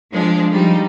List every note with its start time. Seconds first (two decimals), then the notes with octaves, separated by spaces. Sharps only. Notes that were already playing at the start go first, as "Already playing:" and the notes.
0.12 F3 G#3 D4
0.53 F3 G3 D#4